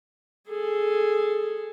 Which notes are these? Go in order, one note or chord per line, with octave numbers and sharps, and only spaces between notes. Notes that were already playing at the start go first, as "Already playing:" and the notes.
G#4 A4